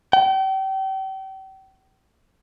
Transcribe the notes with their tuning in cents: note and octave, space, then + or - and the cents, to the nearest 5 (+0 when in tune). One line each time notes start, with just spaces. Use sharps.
G5 -35